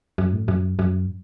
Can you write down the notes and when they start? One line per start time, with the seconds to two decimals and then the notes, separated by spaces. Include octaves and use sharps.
0.18 F#2
0.33 A2
0.48 F#2
0.79 F#2